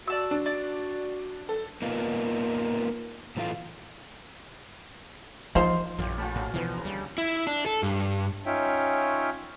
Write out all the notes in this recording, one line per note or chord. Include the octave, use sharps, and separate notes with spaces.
F#4 D5 A5 E6
D4
D5
A4
A#3 B3 D#4 F4
A2 E3 A3 E4 F4
F3 D#4 F4 C5
A#1 F#2 E3 F3 F4 G4 C#5
A3 C#4 F4 G5 A5 B5
A2 F#4
D2 B2 E3 F3 B4
C#3 A#5
D2 G3
E4
D4
A4
G2
C#4 D#4 F4 C#5 E5 G5